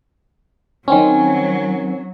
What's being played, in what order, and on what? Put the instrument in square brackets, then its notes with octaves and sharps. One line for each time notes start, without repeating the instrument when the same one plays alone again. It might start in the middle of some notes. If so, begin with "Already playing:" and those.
[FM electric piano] D#3 C4 C#4 [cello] F#3